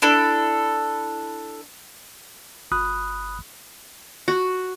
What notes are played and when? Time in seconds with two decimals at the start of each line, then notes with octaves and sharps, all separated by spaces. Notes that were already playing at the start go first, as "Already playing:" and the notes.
0.02 D4 E4 A4
2.71 G1 B5 D#6 F#6
4.28 F#4